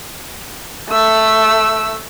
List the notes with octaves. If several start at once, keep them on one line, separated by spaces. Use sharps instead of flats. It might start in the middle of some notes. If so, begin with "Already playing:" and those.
A3 E6